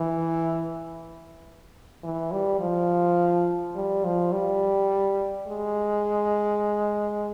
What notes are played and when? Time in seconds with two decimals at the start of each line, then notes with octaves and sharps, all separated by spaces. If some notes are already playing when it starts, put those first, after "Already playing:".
Already playing: E3
2.03 E3
2.32 G3
2.60 F3
3.75 G3
4.04 F3
4.32 G3
5.47 G#3